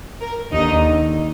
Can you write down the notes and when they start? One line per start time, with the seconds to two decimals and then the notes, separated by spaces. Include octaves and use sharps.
0.20 A#4
0.52 D#2 D3 D#4